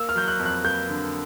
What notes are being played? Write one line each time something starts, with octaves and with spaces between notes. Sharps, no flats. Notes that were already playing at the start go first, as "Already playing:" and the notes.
Already playing: A#3 E6
F6
F#3 G6
F#6
F2
F#6
A#3 G6
D3